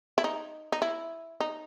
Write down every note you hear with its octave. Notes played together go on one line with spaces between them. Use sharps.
E4
D#4
D#4
E4
D#4